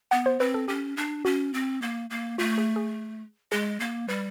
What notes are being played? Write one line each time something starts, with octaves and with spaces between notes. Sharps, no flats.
B3 F#5
C5
C4 B4
A4
C#4 G4
D4
C#4 F#4
C4
A#3
A#3
A3 F4
G#4
G#4
G#3 G#4
A#3
G3 B4